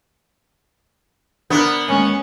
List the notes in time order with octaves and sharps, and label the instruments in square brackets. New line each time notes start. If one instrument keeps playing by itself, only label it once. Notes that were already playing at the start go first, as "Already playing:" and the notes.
[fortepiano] D3 D4 A#4 [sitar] B3 [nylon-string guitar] C5 D5
[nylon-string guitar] D#2 G#3 G#5 [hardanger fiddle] C#4